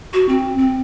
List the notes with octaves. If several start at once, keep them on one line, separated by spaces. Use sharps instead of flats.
F#4
C4
C4